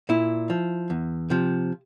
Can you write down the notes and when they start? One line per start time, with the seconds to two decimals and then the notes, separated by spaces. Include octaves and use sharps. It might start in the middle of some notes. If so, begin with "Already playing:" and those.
0.09 A#2 E4
0.50 F3
0.90 E2
1.30 C3 F3